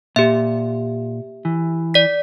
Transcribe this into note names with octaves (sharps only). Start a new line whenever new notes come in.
A#2 G4 E5
E3
D5 B6